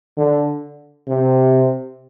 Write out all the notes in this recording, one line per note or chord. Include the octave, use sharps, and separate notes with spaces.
D3
C3